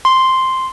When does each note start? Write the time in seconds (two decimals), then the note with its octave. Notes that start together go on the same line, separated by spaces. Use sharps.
0.05 C6